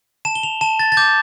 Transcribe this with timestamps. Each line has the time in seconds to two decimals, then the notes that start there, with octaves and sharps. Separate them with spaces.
0.25 A5 E7
0.35 G7
0.43 F7
0.61 A5 E7
0.79 A6
0.92 A6
0.97 D6 G6